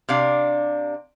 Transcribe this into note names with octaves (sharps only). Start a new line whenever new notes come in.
C3 D4 F5